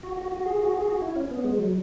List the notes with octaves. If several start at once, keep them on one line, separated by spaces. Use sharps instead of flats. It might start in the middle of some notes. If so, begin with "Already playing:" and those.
F#4
F#4
F#4
G#4
F#4
G#4
F#4
E4
C#4
B3
G#3
F#3